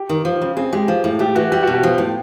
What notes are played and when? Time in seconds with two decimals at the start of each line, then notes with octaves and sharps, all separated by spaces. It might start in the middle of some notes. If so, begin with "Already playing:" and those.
Already playing: G4
0.09 D#3
0.25 F3
0.42 C#3
0.56 C4 G#4
0.73 G#3 G4
0.88 F3
1.04 A2
1.19 A3 G4
1.35 E3 F#4
1.51 G3 G4
1.63 B2 F#4
1.74 G4
1.83 F3
1.98 A2